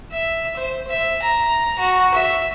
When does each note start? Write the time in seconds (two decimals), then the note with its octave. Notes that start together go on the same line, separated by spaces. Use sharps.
0.12 E5
0.57 C5
0.88 E5
1.23 A#5
1.79 F#4
2.14 E5